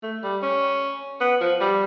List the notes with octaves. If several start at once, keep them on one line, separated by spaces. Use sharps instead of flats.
A3
G3
C#4
B3
F3
G3